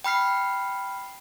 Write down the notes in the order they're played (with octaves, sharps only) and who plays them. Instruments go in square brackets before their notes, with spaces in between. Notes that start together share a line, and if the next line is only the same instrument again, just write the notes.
[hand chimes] G5 B5 F6 C7